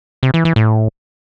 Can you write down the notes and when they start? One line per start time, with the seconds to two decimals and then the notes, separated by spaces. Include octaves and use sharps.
0.23 C3
0.34 E3
0.45 E3
0.56 A2